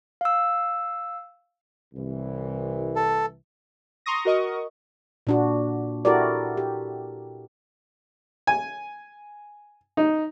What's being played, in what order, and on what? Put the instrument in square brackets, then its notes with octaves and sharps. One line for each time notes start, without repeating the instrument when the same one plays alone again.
[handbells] F5 E6
[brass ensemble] C2 E3
[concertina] A4
[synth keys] A#5 C6 C#6 D#6 A#6
F#4 A#4 D#5 C#6 D#6
[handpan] A#2 D4 F#4
E4 F#4 G4 A4 A#4 D5
G4
[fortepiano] G#5
D#4